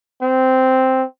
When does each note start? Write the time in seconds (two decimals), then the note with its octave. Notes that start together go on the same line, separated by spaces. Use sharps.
0.22 C4